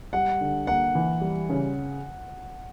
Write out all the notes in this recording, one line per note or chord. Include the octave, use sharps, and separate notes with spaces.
G3 F#5
D3
A#3 F#5
E3
G3
C#3